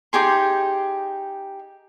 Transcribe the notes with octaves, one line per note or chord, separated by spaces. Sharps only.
D#4 G4 G#4 C6